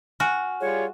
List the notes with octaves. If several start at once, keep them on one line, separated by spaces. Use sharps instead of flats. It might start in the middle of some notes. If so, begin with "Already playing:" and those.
F#4 G#5 F6
G3 F4 G#4 C#5